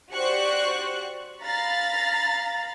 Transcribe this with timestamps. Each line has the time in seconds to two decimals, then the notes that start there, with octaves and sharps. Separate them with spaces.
0.13 F#4 G4 C5 D5 C#6 F#6
1.43 F5 A#5 B5 A6